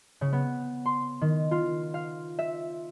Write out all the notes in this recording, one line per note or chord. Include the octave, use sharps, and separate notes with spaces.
C#3
B3
C6
D#3
F4
F5
E5